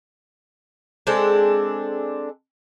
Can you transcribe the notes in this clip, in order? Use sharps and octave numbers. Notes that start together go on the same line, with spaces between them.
G#3 C4 D4 A4